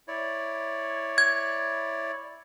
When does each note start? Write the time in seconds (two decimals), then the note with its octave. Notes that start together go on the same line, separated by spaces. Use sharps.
0.08 E4 C#5 D5
1.18 G#6